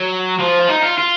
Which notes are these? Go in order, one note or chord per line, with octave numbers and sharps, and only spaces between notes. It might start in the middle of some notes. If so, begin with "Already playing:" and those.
Already playing: F#3
F3
F4
D#4
F4
F4